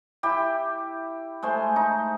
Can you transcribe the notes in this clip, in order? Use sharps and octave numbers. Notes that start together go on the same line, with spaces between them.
E4 G4
G#3 A3 C5
D#4